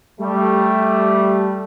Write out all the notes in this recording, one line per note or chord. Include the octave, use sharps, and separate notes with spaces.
G3 A3